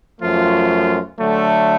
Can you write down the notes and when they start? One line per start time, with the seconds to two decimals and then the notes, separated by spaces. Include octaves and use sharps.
0.21 F#2 F3 A3 F4
1.20 D3 F#3 A3